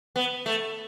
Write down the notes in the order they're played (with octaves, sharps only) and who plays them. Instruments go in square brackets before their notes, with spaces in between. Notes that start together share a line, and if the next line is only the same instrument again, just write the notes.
[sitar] B3
A3